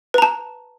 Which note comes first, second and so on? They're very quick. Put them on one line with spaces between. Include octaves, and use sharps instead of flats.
B4 A#5 A5